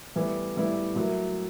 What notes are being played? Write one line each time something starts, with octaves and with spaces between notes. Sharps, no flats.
A2 E3 G3 B3 E4
A2 E3 G3 B3 E4
A2 F#3 A#3